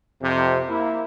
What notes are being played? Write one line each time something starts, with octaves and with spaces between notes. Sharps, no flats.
F2 C3
A#3 E4